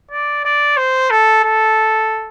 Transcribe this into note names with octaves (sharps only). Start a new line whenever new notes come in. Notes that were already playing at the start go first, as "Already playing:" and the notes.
D5
D5
C5
A4
A4